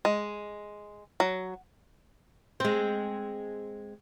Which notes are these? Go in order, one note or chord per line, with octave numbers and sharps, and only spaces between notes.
G#3
F#3
G#3 C4